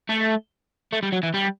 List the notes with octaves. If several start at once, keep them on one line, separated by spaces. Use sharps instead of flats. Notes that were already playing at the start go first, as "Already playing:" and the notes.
A3
A3
G3
F#3
E3
G3